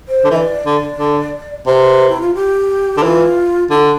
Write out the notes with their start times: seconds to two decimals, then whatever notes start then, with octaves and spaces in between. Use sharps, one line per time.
0.09 C5
0.24 D3
0.31 E3 E5
0.36 D5
0.66 D3
0.99 D3
1.67 C3 C5
1.71 B4
2.08 E4
2.21 F4
2.35 G4
2.97 D3
3.03 E3 F4
3.71 D3 E4
3.75 D4